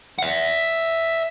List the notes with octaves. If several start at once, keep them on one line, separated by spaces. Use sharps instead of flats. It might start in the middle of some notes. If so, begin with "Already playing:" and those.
E5 F#5